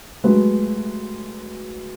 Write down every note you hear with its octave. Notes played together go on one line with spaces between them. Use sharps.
F#3 G#3 A3 G4 B4